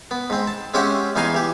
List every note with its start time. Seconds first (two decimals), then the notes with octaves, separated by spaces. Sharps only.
0.11 B3
0.30 G#2 C4
0.47 A5
0.74 G#3 C4 C#4 G4 E5 F#5
1.15 E2 E3 D#4 F5 G#5 C6
1.34 E3 G4